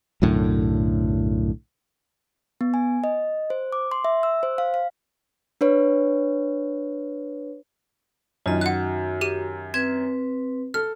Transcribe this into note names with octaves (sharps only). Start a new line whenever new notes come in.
B1 F#2 A2 D3
B3
G#5
D#5
C5
D6
C6
E5
E6
C5
F5
F5
D4 B4 C#5
F#2 D#3 F4 D#5
F#4 F#5 F#6
G4 D#7
C4 B4 G#6
A4 F6